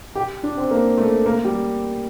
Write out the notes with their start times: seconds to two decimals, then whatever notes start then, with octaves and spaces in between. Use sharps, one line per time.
0.15 G4
0.43 D4
0.57 C4
0.71 A#3
0.98 A3
1.26 A#3
1.44 G3